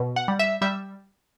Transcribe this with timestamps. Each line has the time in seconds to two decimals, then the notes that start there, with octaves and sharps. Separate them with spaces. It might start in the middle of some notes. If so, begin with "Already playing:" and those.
Already playing: B2
0.16 F#5
0.28 G3
0.39 E5
0.62 G3 E5